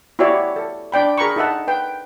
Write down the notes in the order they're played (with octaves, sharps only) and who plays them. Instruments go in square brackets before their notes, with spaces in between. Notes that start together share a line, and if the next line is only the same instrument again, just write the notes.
[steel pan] E4 F#4 G4 C#5 D5 E5
A4
D4 D5 G5 B5
G#4 A#4 A#5 B5 C#6
D#4 A4 E5 F#5 A5
B4 G5